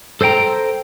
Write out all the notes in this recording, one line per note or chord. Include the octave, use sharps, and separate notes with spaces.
A4 C5 D5 G5 A#5